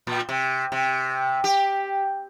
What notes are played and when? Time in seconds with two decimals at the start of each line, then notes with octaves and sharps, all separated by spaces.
0.07 A#2
0.29 C3
0.72 C3
1.44 G4